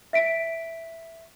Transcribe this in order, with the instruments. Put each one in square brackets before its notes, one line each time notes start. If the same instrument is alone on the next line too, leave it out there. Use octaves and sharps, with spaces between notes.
[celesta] E5 B6 D7